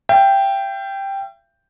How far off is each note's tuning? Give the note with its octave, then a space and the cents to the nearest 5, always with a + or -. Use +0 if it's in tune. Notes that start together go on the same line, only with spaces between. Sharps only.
E5 +45 G5 +0